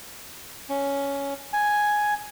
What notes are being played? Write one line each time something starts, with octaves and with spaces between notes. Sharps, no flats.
C#4
G#5